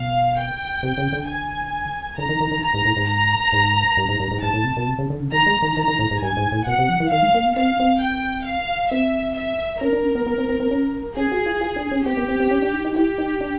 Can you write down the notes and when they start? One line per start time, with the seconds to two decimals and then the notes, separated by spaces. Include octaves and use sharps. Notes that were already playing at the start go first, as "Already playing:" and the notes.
Already playing: B2 F5
0.38 G5
0.83 C3
0.98 C#3
1.12 D3
1.27 G#5
2.17 D3 A#5
2.29 D#3
2.40 D#3
2.51 D#3
2.62 A#5
2.74 G#2
2.85 A2
2.97 G#2
3.07 A#5
3.53 G#2
3.97 G2
4.09 G#2
4.20 G2
4.31 G#2
4.42 G#2 A5
4.53 A2
4.64 C3
4.76 B2
4.87 C3
4.98 C#3
5.10 D3
5.20 C#3
5.32 D#3 A#5
5.46 G#3
5.62 D#3
5.77 D#3 A#5
5.88 D#3
5.99 A2
6.11 G#2
6.22 G2 G#5
6.37 G#2
6.52 A2
6.67 B2 F#5
6.78 C3
6.89 F3
7.00 E3
7.11 D#3 F5
7.22 G#3
7.34 A#3
7.45 B3
7.56 C4 F5
7.79 C4
8.01 G5
8.46 F5
8.91 C4 E5
9.37 E5
9.81 C#4 A#4
9.93 D4
10.03 C#4
10.15 B3
10.26 B3
10.38 C4
10.49 C4
10.60 C4
10.71 C#4
11.16 C#4 G#4
11.32 F#4
11.46 F4
11.61 F4
11.76 D4
11.91 C#4
12.05 C4 G4
12.17 B3
12.28 C4
12.40 C4
12.51 C#4
12.62 D4
12.73 D#4
12.85 D#4
12.96 E4 G4
13.18 D#4
13.41 D4